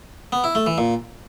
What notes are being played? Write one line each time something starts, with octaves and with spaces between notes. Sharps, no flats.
B3
E4
A3
E3
A#2